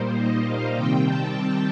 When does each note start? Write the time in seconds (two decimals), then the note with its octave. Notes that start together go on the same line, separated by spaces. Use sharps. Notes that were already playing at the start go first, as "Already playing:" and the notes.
Already playing: A#2 G3 A#3 D#4 C5
0.18 D#5
0.46 F5
0.75 C3 D#3 G3 C4 G5
1.04 A5